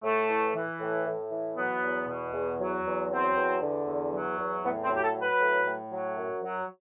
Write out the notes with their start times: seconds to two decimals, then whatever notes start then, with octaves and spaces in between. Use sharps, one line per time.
0.03 A2 A3
0.29 E3
0.55 E3
0.80 A2
1.06 A2
1.31 E3
1.57 F#3 B3
1.83 E2
2.08 B2
2.33 E2
2.60 F#3
2.85 E2
3.10 F#3 C4
3.36 E2
3.62 D3
3.87 E2
4.13 F#3
4.39 E2
4.63 A2 B3
4.83 C4
4.89 F#3
4.96 G4
5.02 A4
5.15 F#3
5.21 B4
5.40 A2
5.66 A2
5.91 F#3
6.16 F#2
6.43 F#3